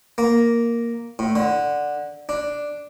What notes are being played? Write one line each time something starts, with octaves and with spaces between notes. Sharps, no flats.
A#3
A2
D3
D4